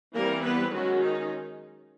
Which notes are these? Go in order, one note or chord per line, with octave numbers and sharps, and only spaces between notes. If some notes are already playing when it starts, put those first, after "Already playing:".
E3 G3 A#3 C4 A#4
B3 B4
D#3 F#3 G#3 C#4 F#4
D#4